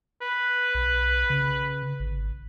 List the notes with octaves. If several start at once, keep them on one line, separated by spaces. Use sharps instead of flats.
B4
B1
C#3
G#1